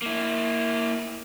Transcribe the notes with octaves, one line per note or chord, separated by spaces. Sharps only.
A#3 E4